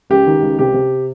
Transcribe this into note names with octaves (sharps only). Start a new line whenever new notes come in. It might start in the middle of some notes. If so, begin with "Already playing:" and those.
C#2 G4
D#3
C#2
C3 G4
C3